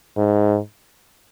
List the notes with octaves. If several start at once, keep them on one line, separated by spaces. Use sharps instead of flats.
G#2